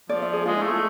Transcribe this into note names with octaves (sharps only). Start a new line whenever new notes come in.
F3 D5
E5
G#4
G#3 F4
E4
A3
F4